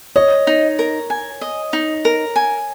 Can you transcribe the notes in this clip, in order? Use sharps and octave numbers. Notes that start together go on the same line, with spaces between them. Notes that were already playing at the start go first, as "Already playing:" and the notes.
C#5 D#5
D#4
A#4
G#5
D#5
D#4
A#4
G#5